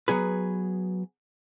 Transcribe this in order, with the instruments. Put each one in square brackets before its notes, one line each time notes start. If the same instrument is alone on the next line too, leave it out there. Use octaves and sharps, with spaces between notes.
[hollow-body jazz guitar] F#3 B3 G#4 B4